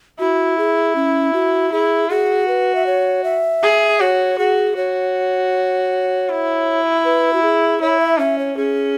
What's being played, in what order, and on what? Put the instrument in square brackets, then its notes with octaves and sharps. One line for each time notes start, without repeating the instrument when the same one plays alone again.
[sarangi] E4 [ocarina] F#4
[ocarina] G#4
C#4
F#4
[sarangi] E4 [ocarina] G#4
[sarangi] F#4 [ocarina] G#4
[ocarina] B4
E5
C#5
E5
[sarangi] G#4
[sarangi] F#4 [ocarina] C#5
[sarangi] F#4 [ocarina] G#4
[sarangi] F#4 [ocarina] C#5
[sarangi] E4
[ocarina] B4
F#4
G#4
[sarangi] E4 [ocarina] C#5
[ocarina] E5
[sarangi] C#4 [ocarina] E5
[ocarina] C#5
[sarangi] C#4 [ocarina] G#4